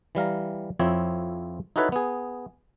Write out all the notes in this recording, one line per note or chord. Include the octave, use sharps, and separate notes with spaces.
E3 G3 F5 A#5
F2 F3 C4 E4 C#5
D#4 E4 F#4 A4 B4 C#5
B3 G#4